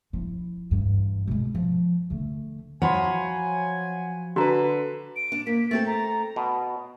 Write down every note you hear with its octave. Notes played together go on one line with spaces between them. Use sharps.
F3 E4
G2 E3
B2 G#3
F3
D3 A3
F3 F#3 C#5 F#5 G#5 B5 C6
D3 F#4 B4 A#5
D7
D4
A#3 B6
A3 C4 A4 A6
A#5
B2